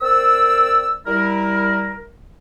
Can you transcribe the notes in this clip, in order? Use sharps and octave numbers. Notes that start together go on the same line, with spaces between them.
C4 A#4 C5 D5 E6
G3 E4 A#4